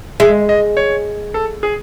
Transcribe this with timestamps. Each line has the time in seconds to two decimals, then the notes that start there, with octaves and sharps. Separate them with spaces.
0.20 G#3 E5
0.49 D#5
0.77 C#5
1.34 A4
1.63 G#4